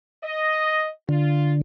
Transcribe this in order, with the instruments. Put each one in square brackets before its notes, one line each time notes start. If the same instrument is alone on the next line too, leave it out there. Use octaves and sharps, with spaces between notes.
[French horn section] D#5
[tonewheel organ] D3 [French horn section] F4